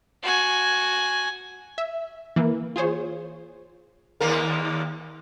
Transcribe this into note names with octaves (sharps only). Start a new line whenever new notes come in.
F#4 G#5
E5
E3 A#3
F4 G#4 C5 C#5
D#2 A#3 A#4